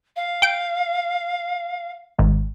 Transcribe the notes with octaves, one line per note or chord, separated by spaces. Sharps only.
F5
G5 D7
G#1 G#2